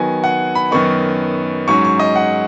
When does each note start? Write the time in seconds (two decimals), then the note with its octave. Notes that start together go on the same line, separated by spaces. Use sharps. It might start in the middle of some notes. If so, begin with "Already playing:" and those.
Already playing: D#3 F#3 B3 G#5
0.24 F#5
0.55 B5
0.71 F#2 D#3 B3 D#4 C#6
1.68 G#2 F#3 C#4 C#6
1.85 C#6
2.00 D#5
2.16 F#5